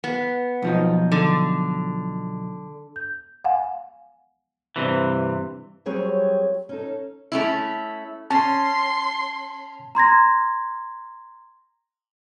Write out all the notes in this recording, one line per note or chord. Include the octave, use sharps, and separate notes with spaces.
B3
B1 F3 D#4
D3
G6
F5 F#5 G#5
G2 C3 E3
F#3 G3 C4 G#4 A#4 C#5
C#4 D#4 A4
A3 C#4 E4
C#4 A5 C6
A#5 C6 G#6 A#6